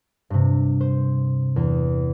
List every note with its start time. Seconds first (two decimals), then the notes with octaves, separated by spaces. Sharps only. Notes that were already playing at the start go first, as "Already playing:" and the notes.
0.30 G2 C3
0.81 C5
1.56 E2